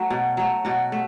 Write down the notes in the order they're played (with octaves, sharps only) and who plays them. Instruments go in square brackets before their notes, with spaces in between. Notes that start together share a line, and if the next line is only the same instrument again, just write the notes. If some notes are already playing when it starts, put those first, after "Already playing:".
Already playing: [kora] F#3 A3 F#4
B2
F#3 A3
B2 F#4
A3